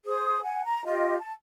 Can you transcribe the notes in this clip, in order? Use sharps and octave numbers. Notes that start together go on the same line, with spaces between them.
G#4 C5 D#6
F#5 G#5
A#5
F4 G4 D#5
A5